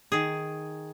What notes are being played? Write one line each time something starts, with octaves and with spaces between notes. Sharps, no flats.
D#3 G#4